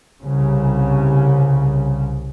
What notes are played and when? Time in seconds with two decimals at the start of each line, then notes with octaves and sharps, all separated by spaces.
0.21 C2 C#3